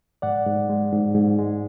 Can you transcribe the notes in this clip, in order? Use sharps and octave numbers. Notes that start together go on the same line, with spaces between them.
G#2 D5 F#5
G#2
G#3
G#2
G#2
G#3